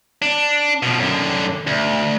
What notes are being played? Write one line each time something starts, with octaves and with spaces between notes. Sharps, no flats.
D4
B2 F3
F#2 D3
D2